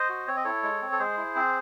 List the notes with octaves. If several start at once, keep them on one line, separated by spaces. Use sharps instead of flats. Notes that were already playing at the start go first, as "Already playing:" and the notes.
Already playing: C5 D#5
F#4
C4 C#5
D#5
E4 A4 C#5
G#3
C4
A4
G#3 G#4 C5
E4
C4